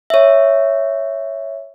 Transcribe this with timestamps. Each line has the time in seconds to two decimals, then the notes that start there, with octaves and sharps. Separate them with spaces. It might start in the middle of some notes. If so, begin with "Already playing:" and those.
0.10 C#5 E5